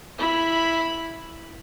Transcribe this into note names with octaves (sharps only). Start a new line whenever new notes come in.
E4 B5